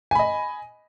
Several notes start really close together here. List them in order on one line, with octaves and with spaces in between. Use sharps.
G#5 B5 D#5